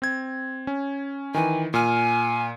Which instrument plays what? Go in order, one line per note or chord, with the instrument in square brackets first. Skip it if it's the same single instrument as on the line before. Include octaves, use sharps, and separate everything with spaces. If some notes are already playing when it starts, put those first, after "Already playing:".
[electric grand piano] C4 G#6
C#4
[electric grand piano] D#3 E3 [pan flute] G#5
[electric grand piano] A#2 F6 [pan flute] G#5